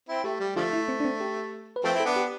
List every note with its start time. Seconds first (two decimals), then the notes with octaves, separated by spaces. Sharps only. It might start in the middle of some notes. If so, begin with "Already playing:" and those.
0.08 C4 E4
0.24 A3 G4
0.40 G3
0.56 D3 F3 A3 F4
0.73 E4
0.88 C4
1.00 D4
1.05 C4
1.21 G4
1.76 B4
1.84 F3 A3 C4 A4
1.95 E4
2.00 A4
2.05 B3 D4
2.16 G4